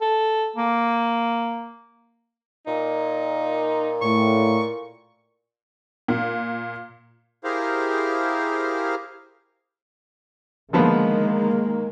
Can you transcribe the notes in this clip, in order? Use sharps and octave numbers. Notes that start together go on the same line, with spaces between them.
A4
A#3
A#2 D#4
A2 C#6
A#2
E4 G4 G#4 A#4 C5 F5
D3 D#3 F3 G#3 A#3 B3